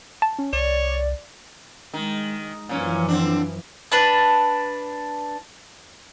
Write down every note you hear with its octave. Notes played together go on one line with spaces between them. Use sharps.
A5
C#4
C2 C#5 D5
D#3 G#3
F#2 A#2 E3 F3 C#4
D3 C4 D4
D4 B4 A5